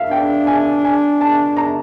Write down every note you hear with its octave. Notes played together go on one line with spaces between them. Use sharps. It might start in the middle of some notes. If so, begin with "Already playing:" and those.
Already playing: E5 F5
D4 G5
G#5
G#5
A5
A#5